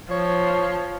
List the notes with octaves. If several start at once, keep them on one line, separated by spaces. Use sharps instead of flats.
F3 C#5